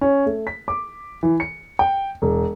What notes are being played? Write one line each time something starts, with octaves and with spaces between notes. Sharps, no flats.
C#4
A3
B6
D6
E3
C#7
G5
E1